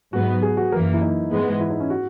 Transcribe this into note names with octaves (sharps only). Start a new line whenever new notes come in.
G#2 F#3 B3 F#4
G#4
F#4
F#2 E3 A#3 A#4
E4
D#4
G#2 E3 G#3 B3
E4
D#4
C#4
F#4